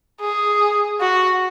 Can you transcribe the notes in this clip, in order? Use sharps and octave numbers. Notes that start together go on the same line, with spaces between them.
G#4
F#4